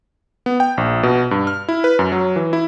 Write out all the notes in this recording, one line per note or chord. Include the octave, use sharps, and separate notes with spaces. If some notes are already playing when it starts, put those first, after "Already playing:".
B3
G5
A#1
B2
G2
F6
E4
B4
F#2
F#3
E3
E4